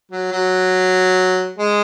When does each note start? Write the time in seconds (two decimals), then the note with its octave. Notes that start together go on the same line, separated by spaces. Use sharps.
0.12 F#3
0.32 F#3
1.58 G#3